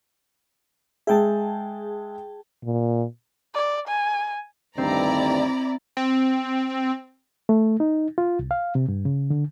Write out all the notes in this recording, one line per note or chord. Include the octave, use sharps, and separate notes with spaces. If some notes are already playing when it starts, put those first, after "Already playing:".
G#3 G#4 E5 G5 A5
A#2
D5
G#5
D2 G2 D#3 C4 E4 D5 A#5
C4
A3
D#4
F4
C2
F5
C3
G2
C#3
D3